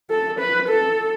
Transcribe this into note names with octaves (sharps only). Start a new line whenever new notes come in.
A4
B4
A4